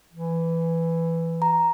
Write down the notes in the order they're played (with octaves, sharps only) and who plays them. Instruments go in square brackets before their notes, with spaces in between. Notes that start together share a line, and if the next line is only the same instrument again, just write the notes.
[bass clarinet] E3
[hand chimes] A#5